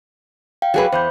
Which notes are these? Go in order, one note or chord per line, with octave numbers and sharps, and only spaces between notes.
F5 G5
F#3 G#4 B4
E2 C5 B5 G6